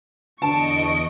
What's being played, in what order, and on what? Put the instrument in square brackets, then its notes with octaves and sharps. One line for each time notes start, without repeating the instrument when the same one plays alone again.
[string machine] E2 D#5 [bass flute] D3 [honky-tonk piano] A5 [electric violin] C#6 D7